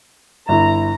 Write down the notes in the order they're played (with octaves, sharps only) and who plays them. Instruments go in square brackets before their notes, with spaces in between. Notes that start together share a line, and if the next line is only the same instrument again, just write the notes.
[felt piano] G1 E4 [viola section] A#5